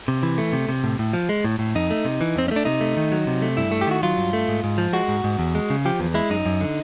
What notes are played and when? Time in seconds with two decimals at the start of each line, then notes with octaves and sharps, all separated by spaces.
0.08 C3
0.23 E3
0.38 A3
0.53 C3
0.69 C3
0.84 A2
0.99 A2
1.13 F3
1.29 G#3
1.45 A2
1.59 A2
1.75 F2 D#4
1.91 A3
2.05 C3
2.21 E3
2.36 F2 C4
2.48 C#4
2.51 A3 D4
2.65 C3 D#4
2.81 A3
2.97 D#3
3.12 F#3
3.27 C3
3.42 A3
3.57 G2 E4
3.72 A3
3.81 G4
3.87 D#3 F#4
4.03 F#3 F4
4.18 G2
4.33 A3
4.48 G#2
4.64 G#2
4.78 F3
4.93 G#3 F#4
5.08 G#2
5.24 G#2
5.39 E2
5.55 G#3
5.70 C#3
5.85 F3 G4
6.00 E2
6.14 G#3 E4
6.30 F#2 D#4
6.46 F#2
6.61 D3